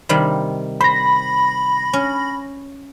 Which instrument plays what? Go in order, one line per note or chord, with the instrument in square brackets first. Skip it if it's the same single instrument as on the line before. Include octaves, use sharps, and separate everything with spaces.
[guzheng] C3 D#3 G3
[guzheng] C5 [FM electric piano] B5 A#6
[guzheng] C#4